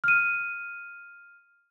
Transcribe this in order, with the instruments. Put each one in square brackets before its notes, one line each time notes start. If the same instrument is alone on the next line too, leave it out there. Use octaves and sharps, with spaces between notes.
[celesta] F6 D#7